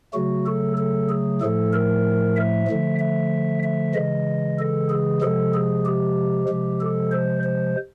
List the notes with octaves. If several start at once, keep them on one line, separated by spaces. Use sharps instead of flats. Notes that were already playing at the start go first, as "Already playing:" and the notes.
C#3 F#3 A3 F#4
A4
A4
G#4
A2 F3 A3 A4
A#4
E5
D3 F3 A3
E5
E5
C#3 E3 G#3 D#5
A4
G#4
C3 F3 G#3 A4
G#4
G4
C3 F3 G#3
A4
C5
C5